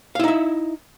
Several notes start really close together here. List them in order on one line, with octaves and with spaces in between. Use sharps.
F5 E4 D#4 E5